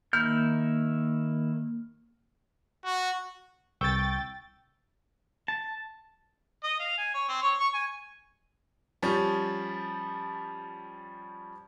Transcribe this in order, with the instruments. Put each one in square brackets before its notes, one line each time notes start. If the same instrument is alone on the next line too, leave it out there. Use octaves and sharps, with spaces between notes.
[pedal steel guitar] D#3 E4 G6 [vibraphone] A#3 [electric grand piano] F6
[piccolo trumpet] F#4
[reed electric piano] C2 C#6 E6 [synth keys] G5 A6
[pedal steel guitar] A5
[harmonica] D#5
F5
G#5
C#5
C4
C#5
C#6
G#5
[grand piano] F3 G3 C#4